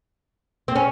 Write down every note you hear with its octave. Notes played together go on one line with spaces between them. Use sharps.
C4
C#4